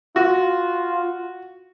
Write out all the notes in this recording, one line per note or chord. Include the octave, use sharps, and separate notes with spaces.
F4 F#4